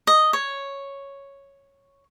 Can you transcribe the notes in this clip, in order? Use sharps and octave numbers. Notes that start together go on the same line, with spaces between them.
D#5
C#5